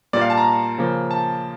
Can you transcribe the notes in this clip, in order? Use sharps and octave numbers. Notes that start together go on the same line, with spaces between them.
A#2 G3 A#3 D5
F5
A5
A#5
C#3 F3 A#3
A5